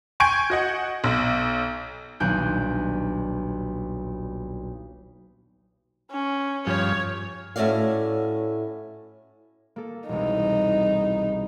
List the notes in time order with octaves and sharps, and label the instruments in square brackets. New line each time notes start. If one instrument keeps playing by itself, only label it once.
[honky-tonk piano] G5 G#5 C#6 G6 G#6 D7
F#4 D#5 F#5
B1
[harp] D#1 B1 D4 G#5 F#6 G6
[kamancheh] C#4
[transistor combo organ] G2 F3 [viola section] C#5
[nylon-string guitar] A2 A3 C#4 F#4 D5 F5
[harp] A#3 A4
[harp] E1 C2 [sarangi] D#4